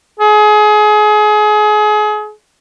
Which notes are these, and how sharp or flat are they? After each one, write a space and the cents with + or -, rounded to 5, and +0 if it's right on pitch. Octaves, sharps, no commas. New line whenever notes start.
G#4 +30